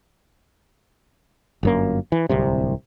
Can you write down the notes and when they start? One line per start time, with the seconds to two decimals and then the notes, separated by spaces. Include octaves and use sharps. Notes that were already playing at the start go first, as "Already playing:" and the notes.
1.63 G1 F#2 A#3
2.12 E3
2.30 D1 C2 C3